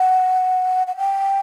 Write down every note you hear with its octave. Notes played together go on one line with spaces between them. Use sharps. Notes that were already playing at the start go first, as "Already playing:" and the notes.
Already playing: F#5
F#5
G5